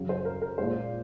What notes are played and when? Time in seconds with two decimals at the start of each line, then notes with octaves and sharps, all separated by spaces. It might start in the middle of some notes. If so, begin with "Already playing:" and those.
Already playing: F#2 C#3 F#3
0.09 C5
0.25 A#4
0.42 A#4
0.58 A#2 G#3 C5